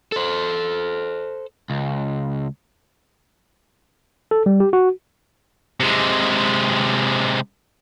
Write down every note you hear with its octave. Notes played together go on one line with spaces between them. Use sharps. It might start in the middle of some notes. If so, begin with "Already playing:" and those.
A4 C5
C#2
A4
G3
G4
F#4
C3 G#3